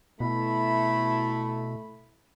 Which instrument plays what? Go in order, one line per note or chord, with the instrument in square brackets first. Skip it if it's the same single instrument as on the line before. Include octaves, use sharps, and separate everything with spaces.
[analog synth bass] B2 [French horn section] A3 E4 [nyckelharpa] B5